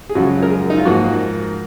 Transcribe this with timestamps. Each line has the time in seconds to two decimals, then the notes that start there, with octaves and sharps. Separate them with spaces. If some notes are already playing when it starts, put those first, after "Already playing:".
0.09 G#4
0.15 F#2 C#3 F3 G#3 F#4
0.42 A#4
0.50 G#4
0.70 D#4
0.77 F4
0.85 G#2 F3 A#3 F#4